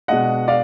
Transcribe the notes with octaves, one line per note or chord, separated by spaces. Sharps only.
B2 G#3 D4 D#5 F#5
D5 F5